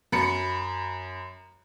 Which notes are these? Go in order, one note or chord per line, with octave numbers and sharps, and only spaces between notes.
F#2 B5 C#7